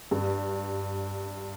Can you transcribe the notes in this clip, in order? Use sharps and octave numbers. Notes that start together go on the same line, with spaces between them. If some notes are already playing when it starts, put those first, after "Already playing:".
G2